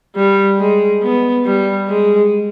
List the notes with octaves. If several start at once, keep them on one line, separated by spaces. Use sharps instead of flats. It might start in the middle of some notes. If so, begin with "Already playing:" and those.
G3
G#3
B3
G3
G#3